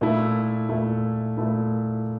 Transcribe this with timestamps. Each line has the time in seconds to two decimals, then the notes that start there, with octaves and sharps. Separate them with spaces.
0.01 A#2 A3 E4
0.69 A#2 A3 E4
1.37 A#2 A3 E4